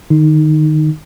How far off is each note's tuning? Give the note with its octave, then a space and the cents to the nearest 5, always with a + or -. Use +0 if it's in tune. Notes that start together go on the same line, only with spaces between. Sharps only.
D#3 -30 D#4 +0